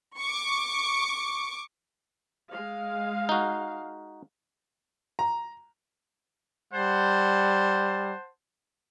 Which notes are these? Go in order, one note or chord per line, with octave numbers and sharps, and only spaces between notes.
C#6 D6
G#3 F5
D#4 F#4
A#5
G3 C5 F#5 A5